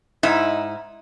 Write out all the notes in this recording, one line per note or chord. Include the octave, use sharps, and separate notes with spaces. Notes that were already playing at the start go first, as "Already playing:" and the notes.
G#2 D#4 E4